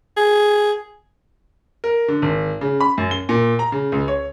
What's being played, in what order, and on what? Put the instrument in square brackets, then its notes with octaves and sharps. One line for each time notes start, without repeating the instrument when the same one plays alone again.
[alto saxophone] G#4
[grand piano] A#4
D3
G#1
C#3
B5
F#2
G7
A#2
A#5
C#3
C#2
C#5